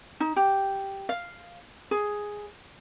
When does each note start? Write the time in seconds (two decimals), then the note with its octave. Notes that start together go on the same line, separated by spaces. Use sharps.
0.20 D#4
0.36 G4
1.09 F5
1.91 G#4